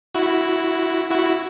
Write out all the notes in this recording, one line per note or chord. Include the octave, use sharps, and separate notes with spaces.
E4 F#4
E4 F#4